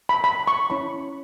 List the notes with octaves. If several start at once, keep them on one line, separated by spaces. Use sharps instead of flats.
B5
B5
C#6
C#4 E4 C#5 B5